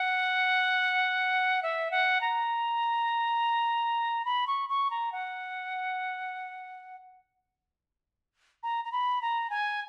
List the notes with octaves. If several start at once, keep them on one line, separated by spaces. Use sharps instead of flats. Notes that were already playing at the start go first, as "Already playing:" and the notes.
Already playing: F#5
E5
F#5
A#5
B5
C#6
C#6
A#5
F#5
A#5
A#5
B5
A#5
G#5